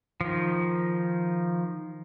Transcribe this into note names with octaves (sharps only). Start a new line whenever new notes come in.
D#3 F3